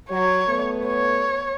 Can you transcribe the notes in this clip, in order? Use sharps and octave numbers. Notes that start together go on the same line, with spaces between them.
F#3 C#5
A3 B3
C#5